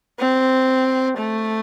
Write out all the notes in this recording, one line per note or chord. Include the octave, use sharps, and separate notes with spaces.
C4
A3